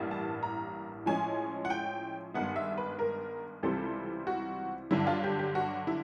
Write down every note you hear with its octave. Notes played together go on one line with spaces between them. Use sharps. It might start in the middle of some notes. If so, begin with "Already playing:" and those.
Already playing: A1 G2 E3 G3 A#3
A5
A#5
A2 F3 G#3 C#4 G#5
F#5
G5
G2 D#3 G#3 B3 F#5
E5
B4
A#4
C#2 C3 E3 G3 C4 A4
F#4
G2 D3 F#3 E4
F4
G4
G4
F#4
E4